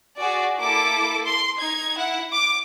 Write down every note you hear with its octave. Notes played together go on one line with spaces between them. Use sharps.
F#4 G#4 D5
A#3 E4 A4 D6
C6
D#4 G#6
E4 F#5
D6